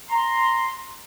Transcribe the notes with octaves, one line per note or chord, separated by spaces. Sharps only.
A#5 C6